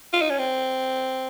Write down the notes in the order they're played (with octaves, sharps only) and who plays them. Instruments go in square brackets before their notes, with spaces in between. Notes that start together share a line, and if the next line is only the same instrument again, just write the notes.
[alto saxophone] F4
D#4
C#4
C4